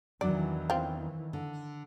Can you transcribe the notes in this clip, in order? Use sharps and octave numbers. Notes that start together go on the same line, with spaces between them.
E2 D#3 E3 F#3 D4 D5
C4 F4
D3